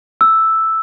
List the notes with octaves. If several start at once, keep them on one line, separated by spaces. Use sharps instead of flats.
E6